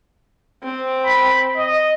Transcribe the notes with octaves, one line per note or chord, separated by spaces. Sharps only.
C4
B5
D#5